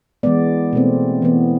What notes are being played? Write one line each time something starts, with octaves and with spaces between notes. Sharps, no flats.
E3 G#3 B3 D5
B2 A3 C4
E3 B3